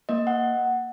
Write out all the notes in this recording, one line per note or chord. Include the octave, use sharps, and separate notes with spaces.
A#3 D#5
F#5